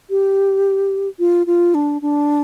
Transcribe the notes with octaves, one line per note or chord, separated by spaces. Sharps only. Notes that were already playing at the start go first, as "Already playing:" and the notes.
G4
F4
F4
D4
D4